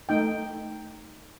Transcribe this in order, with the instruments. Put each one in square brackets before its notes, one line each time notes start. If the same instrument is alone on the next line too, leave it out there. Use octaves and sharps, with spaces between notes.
[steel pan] A3 D#4 G5